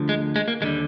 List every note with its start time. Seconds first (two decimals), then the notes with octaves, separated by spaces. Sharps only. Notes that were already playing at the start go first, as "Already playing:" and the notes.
Already playing: D2 D3 F3
0.09 G#3
0.36 G#3
0.48 A#3
0.61 D#2 D3 G3 G#3